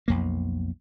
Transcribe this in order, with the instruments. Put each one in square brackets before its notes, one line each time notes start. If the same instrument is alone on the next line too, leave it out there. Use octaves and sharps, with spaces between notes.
[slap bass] B1 F2 A#3